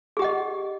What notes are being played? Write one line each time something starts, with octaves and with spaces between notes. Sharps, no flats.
G4 G#4 D#5 F#5